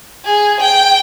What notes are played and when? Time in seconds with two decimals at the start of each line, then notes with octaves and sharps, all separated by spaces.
0.25 G#4
0.60 G5